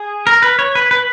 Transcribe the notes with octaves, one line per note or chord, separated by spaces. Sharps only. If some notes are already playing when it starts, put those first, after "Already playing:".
Already playing: G#4
A#4
B4
C#5
B4
B4